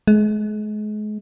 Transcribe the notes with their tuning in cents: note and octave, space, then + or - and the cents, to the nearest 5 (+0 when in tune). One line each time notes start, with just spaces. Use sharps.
G#3 +35